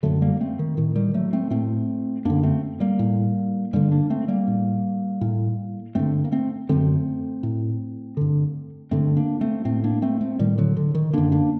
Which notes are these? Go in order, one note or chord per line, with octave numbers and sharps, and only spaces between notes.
F#2 D3 F#3 A3
G3 A#3
A3 C4
D#3
A2 D#3
D#3 G3
F#3 A3
A3 C4
A2 A3 C4
F#2 D3 A#3 D4
A3 C4
G3 A#3
A2
G2 D3 G3 A#3
A#3 D4
A3 C4
G3 A#3
A2
A2
G2 D3 A3 C4
A#3
A3 C4
F#2 D3 A3 C4
A2
G2 D3
G2 D3 A3 C4
A#3 D4
A3 C4
A2 A3 C4
A#3 D4
A3 C4
A3 C4
A2 D#3 G3
D3 F#3
D3
D#3
F#2 D3 A#3 D4
A#3 D4